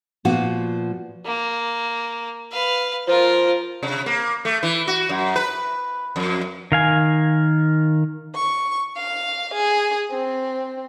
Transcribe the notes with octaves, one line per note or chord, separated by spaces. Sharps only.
A#2 F3 B3 F#4
A#3
B4 F5
F3 F4 A#4
C3
A#3
A3
E3
F#4
F#2
B4
F2
D#3 F5 G#5
C#6
F5
G#4
C4